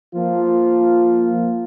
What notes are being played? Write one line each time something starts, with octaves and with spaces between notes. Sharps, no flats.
F3 A#3 F4